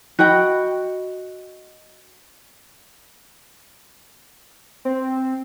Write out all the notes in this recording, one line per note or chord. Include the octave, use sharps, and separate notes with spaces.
F#4 D#5 G5 B5
C4